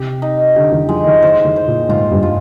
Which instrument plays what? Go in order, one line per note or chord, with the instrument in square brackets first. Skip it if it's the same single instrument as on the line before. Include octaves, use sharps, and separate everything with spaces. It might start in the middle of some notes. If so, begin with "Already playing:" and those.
Already playing: [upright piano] C3 [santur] G4
[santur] D#4
[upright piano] D3 [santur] G4
[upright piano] D#3
[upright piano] F3 [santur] G#3
[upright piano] D#3
[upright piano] D#3 [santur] C5
[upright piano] D#3
[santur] C5
[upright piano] A#2
[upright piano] G#2 [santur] F4
[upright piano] G2
[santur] F4